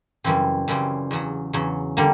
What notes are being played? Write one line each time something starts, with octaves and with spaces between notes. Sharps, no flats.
F#2 C#3 E3 G3 C4
F#2 C#3 E3 G3 C4
E2 C#3 F#3
E2 C#3 F#3
D3 G3 A#3